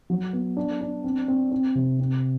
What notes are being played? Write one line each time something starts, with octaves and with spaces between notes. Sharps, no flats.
F#3
B3
D4
D4
C4
C4
C4
C3
C4